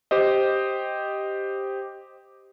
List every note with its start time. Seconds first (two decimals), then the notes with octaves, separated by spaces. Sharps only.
0.11 G4 C5 D#5